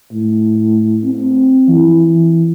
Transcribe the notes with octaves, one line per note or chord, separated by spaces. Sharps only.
A2
C4
E3